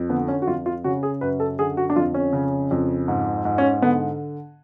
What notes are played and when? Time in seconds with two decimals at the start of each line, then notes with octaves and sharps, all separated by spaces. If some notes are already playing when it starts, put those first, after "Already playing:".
Already playing: F2
0.09 D3 B3
0.28 C#4
0.42 F#4
0.47 F2 F4
0.66 F4
0.84 C#3 F#4
1.03 G#4
1.21 F#2 B4
1.40 A4
1.59 D3 G#4
1.77 F#4
1.90 D4
1.96 F2 F4
2.14 C#4
2.33 C#3
2.71 F2
3.08 G#2
3.45 G#2
3.58 C#4
3.82 D3 B3